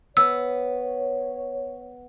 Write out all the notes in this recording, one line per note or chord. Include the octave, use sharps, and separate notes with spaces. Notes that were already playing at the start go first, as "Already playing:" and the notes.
B3 C#5 E6